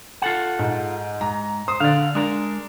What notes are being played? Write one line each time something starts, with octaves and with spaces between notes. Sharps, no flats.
F4 A4 F#5
G#2
G#2 A#5
C5 D#6
D3 D5 F5
G#3 D4 A#4